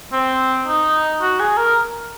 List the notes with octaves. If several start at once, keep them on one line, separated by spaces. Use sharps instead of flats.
C4
D#4
F#4
G#4
A#4